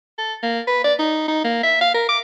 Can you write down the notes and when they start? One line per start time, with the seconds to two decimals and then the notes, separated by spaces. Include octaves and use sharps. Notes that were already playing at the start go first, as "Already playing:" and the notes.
0.18 A4
0.43 A#3
0.68 B4
0.84 D5
0.99 D#4
1.28 D#4
1.44 A#3
1.63 E5
1.81 F5
1.94 A#4
2.09 D6